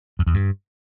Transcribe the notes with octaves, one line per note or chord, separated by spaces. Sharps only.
F2
E2
G2